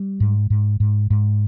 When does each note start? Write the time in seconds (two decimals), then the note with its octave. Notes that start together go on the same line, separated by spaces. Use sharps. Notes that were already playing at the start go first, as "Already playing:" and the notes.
Already playing: G3
0.20 G#2
0.50 G#2
0.80 G#2
1.10 G#2